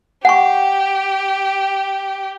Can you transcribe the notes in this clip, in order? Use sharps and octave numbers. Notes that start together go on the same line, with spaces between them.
G4 F#5 G#5 C#6